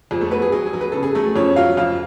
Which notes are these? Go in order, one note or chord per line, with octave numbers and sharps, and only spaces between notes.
F2 G#4
A3 A4
F#3 B3 B4
G#4
F#3 G#4
G#4
F#3
B4
C#3 A4
G#4
F#3 A3 A4
F2 C#4 C#5
F#3 F4 F5
F2 F4 F5